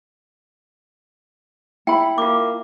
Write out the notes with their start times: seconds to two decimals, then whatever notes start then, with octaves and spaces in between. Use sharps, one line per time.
1.87 E4 G5 B5
2.18 A#3 F4 D6